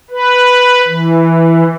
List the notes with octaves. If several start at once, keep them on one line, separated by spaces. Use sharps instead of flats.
B4
E3